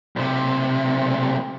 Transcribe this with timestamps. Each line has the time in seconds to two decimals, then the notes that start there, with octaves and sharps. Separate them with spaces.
0.16 B1 C3